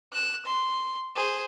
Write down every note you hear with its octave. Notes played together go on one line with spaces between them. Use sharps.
F#6 E7
C6
G#4 C5